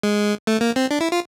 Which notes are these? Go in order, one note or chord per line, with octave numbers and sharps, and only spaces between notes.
G#3
A3
A#3
C4
D4
E4
F4